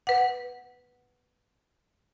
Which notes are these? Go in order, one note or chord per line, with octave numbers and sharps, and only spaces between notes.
B4 F#5